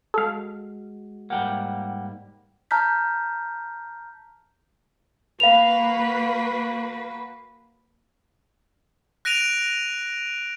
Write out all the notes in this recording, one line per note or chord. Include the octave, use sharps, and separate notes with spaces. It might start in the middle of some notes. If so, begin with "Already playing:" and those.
G#3 F#4 A4 F5
G#2 G3 A#3 F#5 G5
A5 A#5 F6 G6 B6
A#3 F#4 B4 F5 F7
F#6 A#6 D7 D#7 F7